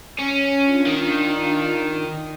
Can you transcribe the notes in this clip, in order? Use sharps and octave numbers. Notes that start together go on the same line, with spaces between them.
C#4
D4 F4
D#3